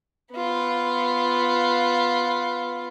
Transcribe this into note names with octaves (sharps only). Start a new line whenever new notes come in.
B3 F4